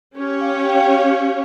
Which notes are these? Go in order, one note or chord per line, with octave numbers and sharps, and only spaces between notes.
C#4 G4 C#5
F5
F5
G5
F5